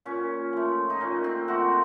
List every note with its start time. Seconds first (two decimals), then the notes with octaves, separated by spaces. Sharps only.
0.05 A#2 C#4
0.53 F3 A3
0.90 D#4
1.00 A#2 C#4
1.24 C4
1.48 F3 A3 F#4